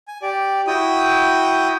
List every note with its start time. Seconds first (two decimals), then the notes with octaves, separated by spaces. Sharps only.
0.08 G#5
0.22 G4 D5
0.67 E4 F#4 G5 D#6